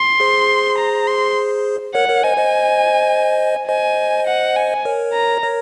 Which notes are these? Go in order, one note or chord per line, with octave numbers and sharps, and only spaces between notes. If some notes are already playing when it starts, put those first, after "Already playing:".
Already playing: C6
G#4 C5
A#5
C6
A#4 C#5 F#5
A#4 C#5
C5 D#5 G#5
C5 D#5
C5 D#5 G#5
F#5
G#5
A#4 C#5
A#5
A#4 C#5